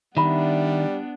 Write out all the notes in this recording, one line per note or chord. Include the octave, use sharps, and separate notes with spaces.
D#3 G3 B3 D4 E5 B5